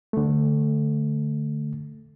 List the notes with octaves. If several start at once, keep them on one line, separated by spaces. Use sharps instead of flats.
D3 A3